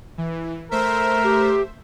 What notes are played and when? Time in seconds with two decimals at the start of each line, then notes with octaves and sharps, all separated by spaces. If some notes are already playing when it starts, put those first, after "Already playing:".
0.18 E3
0.71 A3 A#4 C5 E5
1.24 G4